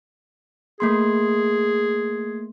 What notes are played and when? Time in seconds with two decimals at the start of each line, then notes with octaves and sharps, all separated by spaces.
0.80 A3 A#3 G#4 C6